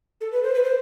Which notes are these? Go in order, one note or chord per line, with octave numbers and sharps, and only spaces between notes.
A4
B4
C5
B4
C5